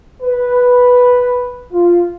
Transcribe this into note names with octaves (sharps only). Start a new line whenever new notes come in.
B4
F4